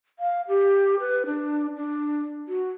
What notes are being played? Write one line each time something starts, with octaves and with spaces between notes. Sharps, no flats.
F5
G4
B4
D4
D4
F#4